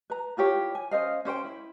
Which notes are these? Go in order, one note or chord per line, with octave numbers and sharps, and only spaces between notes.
B4 A#5
E4 F4 G4 C#5
G#5
C#4 C5 D#5 F5
C#4 C5 C#5 G5
E4